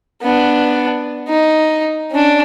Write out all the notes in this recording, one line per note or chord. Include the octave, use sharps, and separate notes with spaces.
B3 D4
D#4
C#4 D4